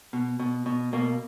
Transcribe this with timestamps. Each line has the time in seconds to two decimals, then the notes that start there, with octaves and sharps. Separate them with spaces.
0.13 B2
0.39 B2
0.66 B2
0.93 B2 A#3